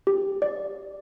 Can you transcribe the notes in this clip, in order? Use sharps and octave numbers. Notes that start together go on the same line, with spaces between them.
G4
D5